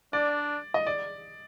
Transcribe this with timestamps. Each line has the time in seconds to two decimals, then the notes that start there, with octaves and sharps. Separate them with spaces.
0.13 D4 D5
0.74 D#5
0.87 D5